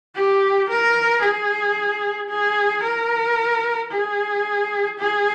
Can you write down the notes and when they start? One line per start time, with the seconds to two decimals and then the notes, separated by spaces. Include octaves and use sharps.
0.15 G4
0.69 A#4
1.22 G#4
2.29 G#4
2.83 A#4
3.92 G#4
4.99 G#4